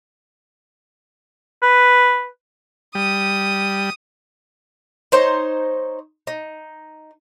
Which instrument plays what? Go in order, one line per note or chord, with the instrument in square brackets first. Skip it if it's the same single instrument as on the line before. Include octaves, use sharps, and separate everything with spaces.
[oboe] B4
[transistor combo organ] G3 [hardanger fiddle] D#6
[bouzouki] D#4 C5 C#5 D#5
D#4